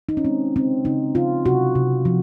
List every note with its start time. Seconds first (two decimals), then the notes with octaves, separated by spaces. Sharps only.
0.09 D#4
0.17 C#4
0.25 G#3 C4
0.56 C#3 C4
0.85 C#3 D#4
1.15 C#3 F4
1.46 C3 F#4
1.75 C3
2.05 F3